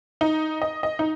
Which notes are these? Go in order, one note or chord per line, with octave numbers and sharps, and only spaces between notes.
D#4
D#5
D#5
D#4